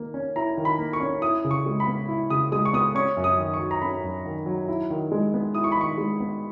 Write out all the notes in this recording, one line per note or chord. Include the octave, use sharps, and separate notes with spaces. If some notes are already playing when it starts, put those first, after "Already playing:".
Already playing: D#3 A#3
C#4
E4 A#5
D#3
B5
A#3
C#6
C#4
E4 D#6
C#3
C#6
G#3
B5
B3
E4
C#3 D#6
G#3 D#6
C#6
B3 D#6
C#4 C#6
F#2
D#6
D#3
C#6
F#3
A#5
C#4 B5
F#2
D#3
F#3
E4
D#3
G#3
B3
E4 D#6
C#6
B5
D#3 C#6
G#3
B3